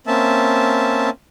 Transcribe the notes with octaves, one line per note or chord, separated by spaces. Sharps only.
A#3 C4 C#4 E5 A5